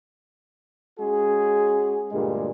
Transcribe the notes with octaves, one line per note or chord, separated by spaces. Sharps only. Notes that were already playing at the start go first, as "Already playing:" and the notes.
G#3 C#4 F#4 G#4
D2 G2 A#2 G3 G#3